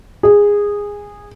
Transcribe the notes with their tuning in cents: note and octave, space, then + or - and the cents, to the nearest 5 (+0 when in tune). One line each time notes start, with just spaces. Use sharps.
G#4 -15